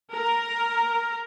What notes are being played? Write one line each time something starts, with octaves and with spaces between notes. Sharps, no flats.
A#4